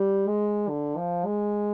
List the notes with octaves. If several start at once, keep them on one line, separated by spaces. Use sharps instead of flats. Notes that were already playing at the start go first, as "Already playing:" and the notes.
Already playing: G3
G#3
D3
F3
G#3